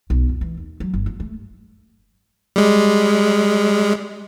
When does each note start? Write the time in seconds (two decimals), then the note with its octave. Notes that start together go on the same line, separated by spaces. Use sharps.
0.10 B1
0.29 F2
0.41 E3
0.57 D#2
0.80 F#3
0.94 G1
1.06 F3
1.20 A3
2.56 G3 G#3